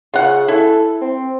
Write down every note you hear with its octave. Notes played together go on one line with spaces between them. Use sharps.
C#3 F4 F#5
E4 A4
C4